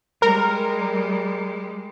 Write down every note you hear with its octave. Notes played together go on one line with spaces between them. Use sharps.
G3 G#3 A#4